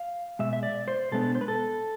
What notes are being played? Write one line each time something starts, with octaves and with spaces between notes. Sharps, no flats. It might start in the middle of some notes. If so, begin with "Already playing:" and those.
Already playing: F5
B2 G#3 E5
E5
D5
C5
B2 G#3 B3 D4 A4
C5
B4
A4